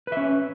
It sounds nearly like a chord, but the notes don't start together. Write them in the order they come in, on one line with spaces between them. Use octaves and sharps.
B4 E5 C#4